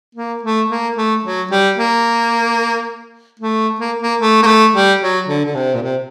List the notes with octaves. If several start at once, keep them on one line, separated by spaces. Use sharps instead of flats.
A#3
A3
A#3
A3
F#3
G3
A#3
A3
A#3
A#3
A3
A#3
A3
G3
F#3
D3
D3
C3
A#2
C3